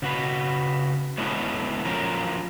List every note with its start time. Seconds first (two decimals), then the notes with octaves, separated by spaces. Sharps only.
0.02 C#3 F#4 B4
1.18 F#3 G#3 A3 B3 C#4 E4
1.85 F3 F#3 C#4 F4 A#4